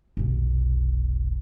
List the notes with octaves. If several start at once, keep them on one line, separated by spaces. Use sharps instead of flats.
F1 B1